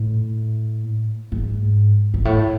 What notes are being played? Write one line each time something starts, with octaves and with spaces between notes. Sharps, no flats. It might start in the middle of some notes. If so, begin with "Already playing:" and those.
Already playing: A2
G#2
G#2
A2